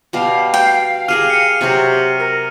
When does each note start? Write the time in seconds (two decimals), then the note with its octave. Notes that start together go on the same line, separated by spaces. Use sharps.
0.13 B2 G3 F5
0.54 G5
1.08 G4 G#4 A#4 F6 D#7 F7
1.30 C#7 D#7
1.61 C3 F#3 F#4 G4
2.19 A#4